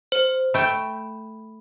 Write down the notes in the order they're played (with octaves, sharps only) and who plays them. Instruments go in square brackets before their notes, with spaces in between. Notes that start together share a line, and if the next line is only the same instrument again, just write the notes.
[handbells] C5
[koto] A3 G5 [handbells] B5